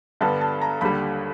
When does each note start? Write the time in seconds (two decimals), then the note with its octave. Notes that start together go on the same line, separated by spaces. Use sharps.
0.21 G2 D3 G3 B3 D4 A5
0.41 A5
0.62 A#5
0.81 D#2 D3 G3 B5